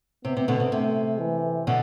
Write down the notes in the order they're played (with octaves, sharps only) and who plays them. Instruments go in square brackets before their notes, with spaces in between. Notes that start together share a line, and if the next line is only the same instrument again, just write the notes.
[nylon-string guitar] C3 [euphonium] B3
[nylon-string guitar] C3
B2 D3
C3
[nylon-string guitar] C3 [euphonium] A3
[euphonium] E3
[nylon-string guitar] B2 D3